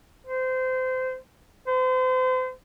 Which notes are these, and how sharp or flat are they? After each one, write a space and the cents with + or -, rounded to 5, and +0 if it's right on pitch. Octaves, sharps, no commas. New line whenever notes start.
C5 -25
C5 -35